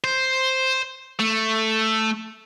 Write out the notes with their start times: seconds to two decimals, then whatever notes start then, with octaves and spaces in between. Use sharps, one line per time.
0.04 C5
1.20 A3